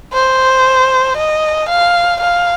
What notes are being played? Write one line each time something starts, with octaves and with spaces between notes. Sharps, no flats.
C5
D#5
F5
F5